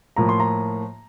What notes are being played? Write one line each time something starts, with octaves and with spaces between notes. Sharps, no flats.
A2 F3 A#3 A#5
C6
A#5